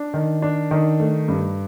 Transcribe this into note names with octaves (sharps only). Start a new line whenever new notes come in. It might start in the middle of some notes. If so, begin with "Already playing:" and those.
Already playing: D4
D#3
D4
D#3
A3
G2